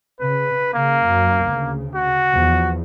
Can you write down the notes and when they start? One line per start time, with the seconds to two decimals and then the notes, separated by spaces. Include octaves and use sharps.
0.20 C#3 B4
0.74 C#3 A#3
1.08 F#2
1.47 D2 C#3
1.95 F#4
2.32 E2 F3